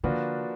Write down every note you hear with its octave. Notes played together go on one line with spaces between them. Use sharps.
D3 F3 A#3 D4 F#4 B4